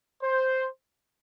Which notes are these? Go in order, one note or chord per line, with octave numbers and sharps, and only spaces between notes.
C5